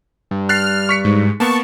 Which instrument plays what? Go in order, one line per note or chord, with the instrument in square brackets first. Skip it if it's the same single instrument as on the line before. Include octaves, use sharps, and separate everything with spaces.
[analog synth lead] G2
[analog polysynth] F6 [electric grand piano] F#6 A6 C7
[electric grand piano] C#6 B6 C#7
[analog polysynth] G#2
[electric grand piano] A#3 B3 [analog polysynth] A5 C#6